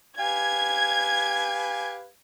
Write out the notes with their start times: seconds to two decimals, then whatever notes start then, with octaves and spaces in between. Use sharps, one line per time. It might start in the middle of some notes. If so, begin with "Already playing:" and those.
0.19 G4 B4 F5 G#5 G#6